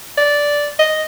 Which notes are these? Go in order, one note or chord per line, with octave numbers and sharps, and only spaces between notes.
D5
D#5